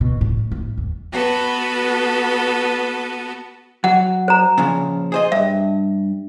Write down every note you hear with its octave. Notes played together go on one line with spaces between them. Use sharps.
B2
A2
A2
E2
B3 F#4 A4 B4
F#3 F#5
C5 A#5
A#2 C#3 F3
G#4 C5 D#5
G2 E5